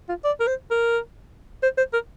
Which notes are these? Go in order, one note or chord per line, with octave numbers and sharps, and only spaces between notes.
F4
D5
A#4
C5
A#4
C5
C5
A#4